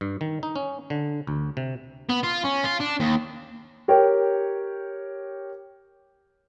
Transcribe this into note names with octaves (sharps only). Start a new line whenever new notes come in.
G2
D#3
D#4
C#4
D3
D2
C3
B3
F4
C#4
F4
D4
D#2
G4 A#4 C#5 G5